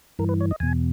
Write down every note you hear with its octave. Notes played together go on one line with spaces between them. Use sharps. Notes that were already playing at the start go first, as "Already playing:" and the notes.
G2 E3 A#4
B4
C#5
D#5
E2 B2 G#5